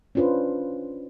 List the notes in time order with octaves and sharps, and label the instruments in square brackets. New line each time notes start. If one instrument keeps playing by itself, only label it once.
[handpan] C#4 D4 F4 B4 C5